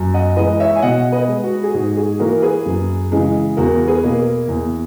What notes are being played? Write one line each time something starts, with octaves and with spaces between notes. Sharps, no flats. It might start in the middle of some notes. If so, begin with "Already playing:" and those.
Already playing: F#2
D#5 F#5
E3 G#3 B4 D#5
C#5 E5
G#5
B2 D#5 F#5
B4 D#5
G#3
F#4
G#4
G#2 F#4
G#4
E3 A#3 F#4 A#4
G#4 B4
F#2
C#3 E3 G#3
E2 F#4 A#4
G#4 B4
B2 A#3
E2